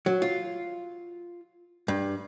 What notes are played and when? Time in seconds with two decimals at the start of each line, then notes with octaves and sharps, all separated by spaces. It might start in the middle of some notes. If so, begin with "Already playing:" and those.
0.06 F#3
0.22 F4
1.88 G2